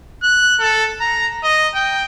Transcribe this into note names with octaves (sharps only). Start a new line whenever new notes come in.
F#6
A4
A#5
D#5
G5